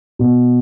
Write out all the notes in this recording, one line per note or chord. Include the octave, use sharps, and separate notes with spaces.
B2